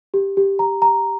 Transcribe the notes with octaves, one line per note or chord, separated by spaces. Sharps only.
G4
G4
A#5
A#5